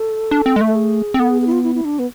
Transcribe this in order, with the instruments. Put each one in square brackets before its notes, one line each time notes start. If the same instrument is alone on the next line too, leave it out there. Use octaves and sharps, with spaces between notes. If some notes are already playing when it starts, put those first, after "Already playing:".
Already playing: [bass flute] A4
[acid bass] D4
C4
G#3
A3
[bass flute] A4
G#4
[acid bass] C4
[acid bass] B3 [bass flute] A4
[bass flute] G#4
G#4
E4
F4
E4
E4
D4
B3